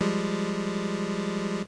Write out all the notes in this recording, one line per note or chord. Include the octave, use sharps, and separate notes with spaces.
F3 G3 G#3